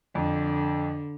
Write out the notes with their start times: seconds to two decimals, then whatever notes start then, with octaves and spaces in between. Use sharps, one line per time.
0.15 F2 D3